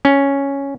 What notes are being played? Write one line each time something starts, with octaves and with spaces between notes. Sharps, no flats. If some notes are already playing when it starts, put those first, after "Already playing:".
C#4